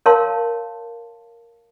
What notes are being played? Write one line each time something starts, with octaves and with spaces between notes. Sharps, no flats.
A#4 C#5 F5 A5 C6